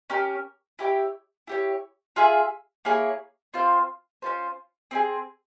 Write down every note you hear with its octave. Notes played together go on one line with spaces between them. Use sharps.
C#4 G4 A#4
E4 G4 C#5 G5
E4 G4 C#5
F4 G#4 E5 G#5
A#3 E4 G#4 C#5
C4 F4 C5 F5
C#4 F4 C5
C4 E4 G#4